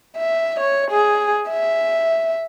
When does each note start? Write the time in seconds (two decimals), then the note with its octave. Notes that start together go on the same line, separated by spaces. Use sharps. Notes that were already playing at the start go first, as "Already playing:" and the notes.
0.17 E5
0.60 C#5
0.91 G#4
1.50 E5